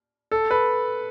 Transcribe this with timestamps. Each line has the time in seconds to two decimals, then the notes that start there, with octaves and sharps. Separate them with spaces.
0.32 A4
0.51 B4